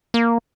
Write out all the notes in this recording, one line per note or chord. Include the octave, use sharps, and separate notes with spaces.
A#3